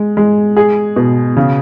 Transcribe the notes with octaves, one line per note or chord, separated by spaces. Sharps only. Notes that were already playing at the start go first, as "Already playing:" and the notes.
Already playing: G#3
G#3
G#4
B2
C#3